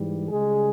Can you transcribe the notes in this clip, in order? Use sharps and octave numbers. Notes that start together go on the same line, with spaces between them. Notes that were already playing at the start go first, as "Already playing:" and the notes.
Already playing: G#2 E3 G3
C#2 C#3 G3 G#3 G#4